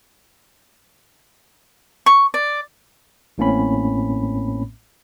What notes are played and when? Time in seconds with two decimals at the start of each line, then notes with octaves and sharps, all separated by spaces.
2.06 C#6
2.34 D5
3.38 A1 A2 A#3 C4 C#4 B5